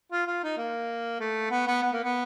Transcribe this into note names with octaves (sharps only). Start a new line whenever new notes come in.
F4
F4
D#4
A#3
A3
B3
B3
B3
A#3
B3